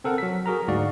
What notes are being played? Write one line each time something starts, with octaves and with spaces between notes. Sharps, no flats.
C4 A4 A#4 F#5
F#3 B6
F#4 G#4 A#4 A#5
D2 G#2 F#4 D5 F5